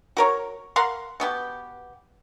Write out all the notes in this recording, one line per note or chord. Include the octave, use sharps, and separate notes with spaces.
F#4 A#4 C#5
A#4 F5 F#5 C6
B2 B3 G4